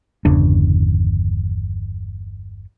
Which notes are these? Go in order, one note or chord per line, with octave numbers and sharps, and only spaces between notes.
G1 E2 C#3 D4